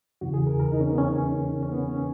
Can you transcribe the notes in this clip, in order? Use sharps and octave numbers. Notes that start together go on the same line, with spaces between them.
E2 C#3 E3 F#4
G#4
A#4
A#4
D#4
C#4
B3
C#4
C#4
B3
C#4